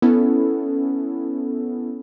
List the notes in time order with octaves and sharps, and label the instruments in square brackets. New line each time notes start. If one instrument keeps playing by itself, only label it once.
[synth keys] B3 C#4 E4 A4